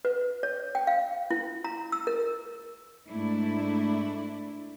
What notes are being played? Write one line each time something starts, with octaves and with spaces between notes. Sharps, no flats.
B4
C#5
G5
F5
E4
A#5
E6
A#4
G#2 A3 D4 E4